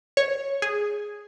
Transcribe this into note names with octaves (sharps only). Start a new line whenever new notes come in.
C#5
G#4